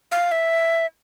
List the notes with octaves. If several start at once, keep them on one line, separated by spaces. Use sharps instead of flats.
F5
E5